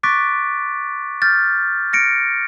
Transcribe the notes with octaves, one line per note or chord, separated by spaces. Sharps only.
C#6 D6 F#6 A6 B6 D7
F6 G6 A6
F6 A#6 C#7 D7